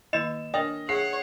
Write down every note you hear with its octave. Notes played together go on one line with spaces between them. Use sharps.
D#3 A#3 E4 D#5 E7
D4 A#4 C#5 D#5 G5
G#4 C#5 E5 F#5 C7